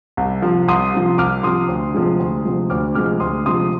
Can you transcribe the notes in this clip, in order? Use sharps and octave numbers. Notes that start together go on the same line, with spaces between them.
C2
C3 F3
C2 C6 D#6
C3 F3
C2 D6 F6
C3 F3 C6 D#6
D2
C3 F3 G#3
D2
C3 F3 G#3
D2 D6 F6
C3 F3 G#3 D6 F6
D2 C6 D#6
C3 F3 G#3 C6 D#6